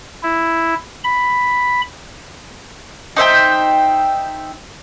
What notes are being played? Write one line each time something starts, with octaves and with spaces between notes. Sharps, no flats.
E4
B5
D#4 C5 E5 G5